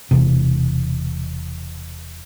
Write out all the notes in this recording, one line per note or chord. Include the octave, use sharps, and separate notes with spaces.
E1 E2 C3